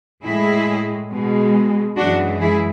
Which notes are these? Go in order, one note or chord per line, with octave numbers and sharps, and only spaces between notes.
A2 G#3 E4 G#4
B2 G#3
F#2 E3 G#3 D4 F#4
E4 G#4